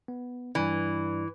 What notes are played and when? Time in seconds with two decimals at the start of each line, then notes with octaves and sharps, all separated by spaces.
0.08 B3
0.55 G2 E3 D5